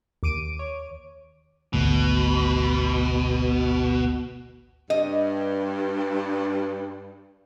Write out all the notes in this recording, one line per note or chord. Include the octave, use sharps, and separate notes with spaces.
D#2 D6 D7 D#7
C#5
G#1 D2 B2
G2 D#5